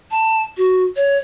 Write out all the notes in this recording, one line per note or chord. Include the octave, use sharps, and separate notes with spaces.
A5
F#4
C#5